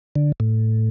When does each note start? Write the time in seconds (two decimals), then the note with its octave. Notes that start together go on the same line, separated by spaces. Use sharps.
0.15 D3
0.40 A2